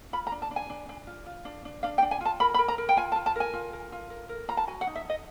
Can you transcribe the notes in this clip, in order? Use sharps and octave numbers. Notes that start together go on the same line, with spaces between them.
F4 B5
A#5
D4
A5
D4
G#5
D4
D4
F4
F4
D4
D4
D4 F5
G5
D4
G#5
F4 A5
A#4 B5
B5
A#4
A#5
A#4
G5
F4 G#5
A5
F4
A5
A#4 G#5
F4
A#4
F4
A#4
A#4
F4 A#5
A5
F#4 G#5
F#5
D#4
E5
D#4 D#5